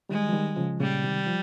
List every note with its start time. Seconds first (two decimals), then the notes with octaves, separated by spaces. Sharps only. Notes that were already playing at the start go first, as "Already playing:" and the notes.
0.09 D#3 G3 G#3
0.29 F3
0.33 D#3 G3
0.56 C#3 F3
0.80 A#2 C#3 G3
1.04 C3 D#3
1.27 F3